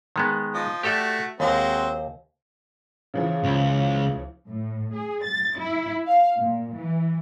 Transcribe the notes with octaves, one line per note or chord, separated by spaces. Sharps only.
D#3 G#3 B3
F3 D#5
A3 F#4 G4 A4 D5
D#2 G#3 C4 F#4
C#3 E3 F3
C#2
A2
G#4
A6
E4
F5
A#2
E3